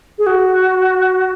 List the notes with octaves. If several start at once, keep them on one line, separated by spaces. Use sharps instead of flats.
G#4
F#4